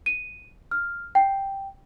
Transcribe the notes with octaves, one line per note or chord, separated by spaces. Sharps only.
D#7
F6
G5